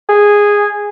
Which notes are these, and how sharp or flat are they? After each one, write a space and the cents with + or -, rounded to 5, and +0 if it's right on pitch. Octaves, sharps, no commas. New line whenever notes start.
G#4 -10